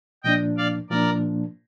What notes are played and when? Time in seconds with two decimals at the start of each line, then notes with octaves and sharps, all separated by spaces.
0.24 A#2 F3 A#3 D4 D#5 G5
0.57 D5 F5
0.90 A#2 F3 A#3 D4 A#4 D5